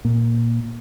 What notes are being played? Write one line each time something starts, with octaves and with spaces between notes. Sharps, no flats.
A#2